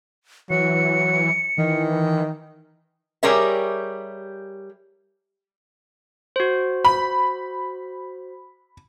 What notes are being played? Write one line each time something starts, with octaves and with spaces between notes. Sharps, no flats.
E3 F#3 C#7
D#3 E3
G3 G4 G#4 A#4 C#5 E5
F#4 C5
B5